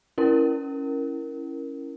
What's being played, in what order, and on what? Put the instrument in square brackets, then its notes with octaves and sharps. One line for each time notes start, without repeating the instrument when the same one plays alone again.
[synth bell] C#4 E4 A#4